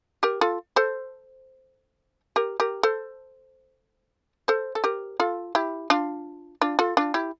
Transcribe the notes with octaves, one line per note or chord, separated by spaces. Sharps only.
G4 A#4
F4 A4
A4 C5
G4 A#4
G4 A#4
A4 C5
A4 C5
A4
G4 A#4
F4 A4
E4 G4
D4 F4
D4 F4
F4 A4
D4 F4
E4 G4